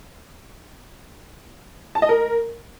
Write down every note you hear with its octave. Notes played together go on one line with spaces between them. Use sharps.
A5
D#5
A#4